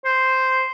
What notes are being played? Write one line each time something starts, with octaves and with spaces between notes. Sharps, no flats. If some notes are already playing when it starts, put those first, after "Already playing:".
C5